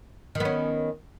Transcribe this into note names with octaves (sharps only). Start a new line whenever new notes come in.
D#3 B3 C#4